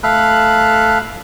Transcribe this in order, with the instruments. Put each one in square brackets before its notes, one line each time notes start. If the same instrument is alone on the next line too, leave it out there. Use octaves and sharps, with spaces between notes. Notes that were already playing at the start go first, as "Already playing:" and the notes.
[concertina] A3 A4 F5 B5 F#6